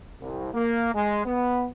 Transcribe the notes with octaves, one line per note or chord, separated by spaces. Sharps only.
C2
A#3
G#3
B3